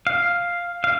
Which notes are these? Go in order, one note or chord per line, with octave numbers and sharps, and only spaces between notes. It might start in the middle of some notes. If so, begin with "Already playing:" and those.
F5
F5